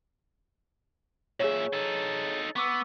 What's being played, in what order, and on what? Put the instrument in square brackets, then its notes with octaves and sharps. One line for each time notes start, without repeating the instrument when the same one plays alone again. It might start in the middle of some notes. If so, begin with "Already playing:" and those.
[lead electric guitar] A#2 E5 [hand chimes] G#4 C#5
[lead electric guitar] D#4 A4
[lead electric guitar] B3 [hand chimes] C#6 D6 E6